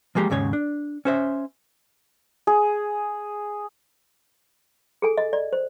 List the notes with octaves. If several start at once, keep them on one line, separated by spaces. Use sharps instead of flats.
F3 G#3 A#3 G4 A#4
D#2 G#2 C#3 C#5
D4
C#4 C5 E5
G#4
G#4 A4 G#5
D#5
D5
C5